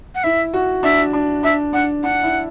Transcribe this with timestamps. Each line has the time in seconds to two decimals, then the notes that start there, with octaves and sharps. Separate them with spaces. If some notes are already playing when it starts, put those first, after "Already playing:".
0.15 F#5
0.24 E4 E5
0.54 F#4
0.83 D4 E5
1.13 D4
1.43 D4 E5
1.73 D4 F#5
2.03 D4 F#5
2.23 E4